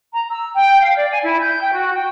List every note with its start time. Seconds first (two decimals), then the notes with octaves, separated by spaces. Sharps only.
0.13 A#5
0.31 E6
0.56 G5
0.81 F5
0.96 D5
1.10 G#5
1.23 E4
1.40 G6
1.61 G5
1.73 F#4
1.95 G5